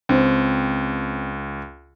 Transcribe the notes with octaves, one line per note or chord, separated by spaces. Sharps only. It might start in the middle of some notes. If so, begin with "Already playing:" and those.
C#2 C4